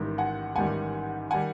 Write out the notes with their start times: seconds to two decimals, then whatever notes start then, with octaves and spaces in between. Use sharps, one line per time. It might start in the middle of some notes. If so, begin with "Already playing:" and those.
Already playing: A1 G#2 D#3 G3
0.18 F#5 G#5
0.55 A1 G#2 D#3 G3 F#5 G#5
1.31 D#3 G3 F#5 G#5